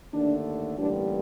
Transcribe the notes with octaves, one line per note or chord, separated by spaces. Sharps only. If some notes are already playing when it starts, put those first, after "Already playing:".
D#2 D3 A3 D4
A1 G2 D3 G3 A#3 D4